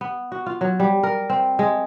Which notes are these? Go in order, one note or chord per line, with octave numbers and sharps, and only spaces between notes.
B3
F#4
F4
F#3
G3
A#4
C4
G#3